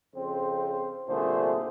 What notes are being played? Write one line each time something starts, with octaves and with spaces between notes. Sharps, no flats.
F2 C#3 C4 C5
C2 A#2 D3 A3 G#4 C5